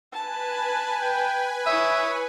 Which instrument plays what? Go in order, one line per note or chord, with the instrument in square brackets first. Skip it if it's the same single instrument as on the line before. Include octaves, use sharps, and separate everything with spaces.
[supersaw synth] B4 G#5 [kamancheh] A5
[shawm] G5
[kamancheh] E4 D#6 [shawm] C#5 [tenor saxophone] E5